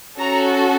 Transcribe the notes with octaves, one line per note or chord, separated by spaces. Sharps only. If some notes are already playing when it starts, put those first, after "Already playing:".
C#4 F#4 A4 A#5